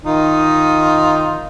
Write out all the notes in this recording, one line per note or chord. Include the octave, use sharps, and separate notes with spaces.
D#3 D#4 F4